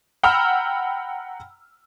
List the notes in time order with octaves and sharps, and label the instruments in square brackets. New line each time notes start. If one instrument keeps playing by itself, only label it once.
[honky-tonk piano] F#5 G5 A#5 B5 E6 F6